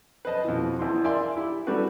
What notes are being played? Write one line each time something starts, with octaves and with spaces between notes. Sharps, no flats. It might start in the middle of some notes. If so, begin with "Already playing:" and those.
B4 C5 D#5 A5
F2 B2 E3
E2 E3 C6
A#4 D5 E5 F5 G#5 C6
E4 G4
E3 G3 A3 C4 F#4 B4